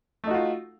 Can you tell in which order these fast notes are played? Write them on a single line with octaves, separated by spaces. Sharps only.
A3 D#4 F#4 F4